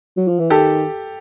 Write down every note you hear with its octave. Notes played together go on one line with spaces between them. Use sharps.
F#3
F3
E3
D#3 G4 A4